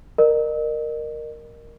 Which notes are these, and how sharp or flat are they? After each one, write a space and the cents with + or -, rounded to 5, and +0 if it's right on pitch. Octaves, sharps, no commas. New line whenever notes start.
A#4 +0 D#5 -40